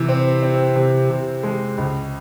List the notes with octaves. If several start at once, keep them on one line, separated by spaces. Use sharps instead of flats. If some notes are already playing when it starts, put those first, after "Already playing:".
Already playing: C3 E3
C4
C4
C3
C3
G#3
C#2